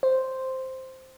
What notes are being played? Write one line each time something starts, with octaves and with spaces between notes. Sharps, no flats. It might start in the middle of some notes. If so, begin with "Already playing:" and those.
C5